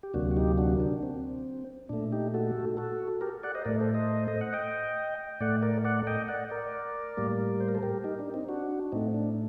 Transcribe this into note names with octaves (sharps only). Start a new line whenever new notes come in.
G4
D2 C3 F#3 A#3 D4 F#4
F#4
D#4 G4
D4 F#4
D4
C4
A#2 A3 D4
D#4 G4
F#4 A4
F#4 A4
G4 A#4
D5 F#5
C5 D#5
A2 A3 A#4 D5
A4 C5
C5 D#5
D#5
F#5
D#5 G5
A2 A3 D5 F#5
A#4 D5
D5 F#5
D#5 G5
D5 F#5
A#4 D5
A2 G3 A#3
C5
A#4
A4 C5
G4 A#4
D#4 G4
D4
C4 D#4
D4 F#4
A2 A3 C4 D#4
D4